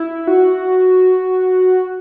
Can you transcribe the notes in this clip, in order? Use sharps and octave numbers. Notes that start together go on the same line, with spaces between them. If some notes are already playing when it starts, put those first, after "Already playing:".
Already playing: E4
F#4